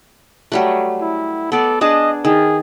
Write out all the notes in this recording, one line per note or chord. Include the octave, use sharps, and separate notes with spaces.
F#3 G3 A3
E4
B3 A4 D5
D4 G#4 D#5 A5
D#3 G#4